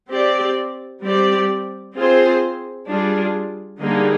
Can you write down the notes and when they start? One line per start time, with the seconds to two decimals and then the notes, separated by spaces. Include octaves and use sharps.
0.11 C4 G4 D5
1.03 G3 C4 G4 D5
1.96 C4 F4 G#4 C5
2.88 G3 D4 F4 G#4
3.80 D3 G3 A#3 D#4 G#4